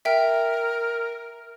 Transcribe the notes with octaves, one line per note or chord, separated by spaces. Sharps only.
A#4 E5 G5